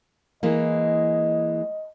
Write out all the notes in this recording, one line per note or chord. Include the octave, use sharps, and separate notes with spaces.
E3 G#3 A#3 D#5